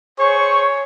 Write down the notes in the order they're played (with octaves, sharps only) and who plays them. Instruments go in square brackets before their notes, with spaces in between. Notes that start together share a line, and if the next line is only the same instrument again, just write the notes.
[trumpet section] G#4 C5 C#6 [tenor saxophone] C#5